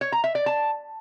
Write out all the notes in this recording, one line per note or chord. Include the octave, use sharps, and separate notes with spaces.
C#5
A#5
E5
D5
A5